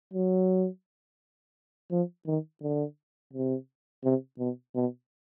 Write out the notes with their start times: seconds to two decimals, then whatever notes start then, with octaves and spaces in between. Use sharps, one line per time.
0.14 F#3
1.91 F3
2.27 D#3
2.62 D3
3.33 C3
4.04 C3
4.39 B2
4.75 B2